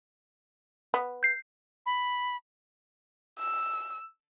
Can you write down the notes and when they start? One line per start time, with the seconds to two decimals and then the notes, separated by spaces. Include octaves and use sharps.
0.94 B3
1.23 G6 C7
1.86 B5
3.39 E6